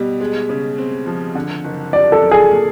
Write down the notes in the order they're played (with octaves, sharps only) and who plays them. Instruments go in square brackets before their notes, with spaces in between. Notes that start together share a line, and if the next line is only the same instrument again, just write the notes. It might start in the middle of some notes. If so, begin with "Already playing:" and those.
Already playing: [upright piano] B2 G3
G#3
C#3
C4
F3
D3
F#1
[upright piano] G3 [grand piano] D5
[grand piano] A4
[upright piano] F#2
[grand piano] G#4
[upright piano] A#3